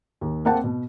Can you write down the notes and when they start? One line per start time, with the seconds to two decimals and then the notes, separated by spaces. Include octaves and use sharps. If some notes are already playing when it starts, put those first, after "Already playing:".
0.21 D#2
0.45 A#3 C4 F#5 G5 A5
0.64 B2